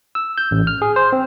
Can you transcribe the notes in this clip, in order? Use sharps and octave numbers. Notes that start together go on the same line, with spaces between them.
E6
G6
A1
F6
G#4
C5
C4